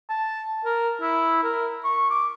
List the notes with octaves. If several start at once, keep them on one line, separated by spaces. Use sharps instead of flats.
A5
A#4
E4
A#4
C#6
D6